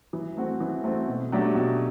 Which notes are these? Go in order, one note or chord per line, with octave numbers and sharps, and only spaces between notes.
E3
A3 C4 F#4
E3
A3 C4 F#4
B2
F#3 A3 D4 G4
B2